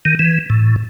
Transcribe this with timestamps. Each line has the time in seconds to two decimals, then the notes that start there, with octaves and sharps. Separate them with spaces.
0.05 D#3
0.19 E3
0.50 A2